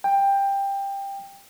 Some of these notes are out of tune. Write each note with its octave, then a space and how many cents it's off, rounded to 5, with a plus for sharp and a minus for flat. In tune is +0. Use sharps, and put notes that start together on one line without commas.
G5 +15